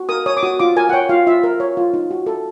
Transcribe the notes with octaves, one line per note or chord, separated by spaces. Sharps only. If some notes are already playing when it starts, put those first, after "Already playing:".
Already playing: F#4
A#4 D#6
C#5 D#6
D6
F#4 D#6
F4 D6
A#4 G#5
F#5
C#5 G5
F4 F5
F4 E5
A#4
C#5
F4
D#4
F#4
A4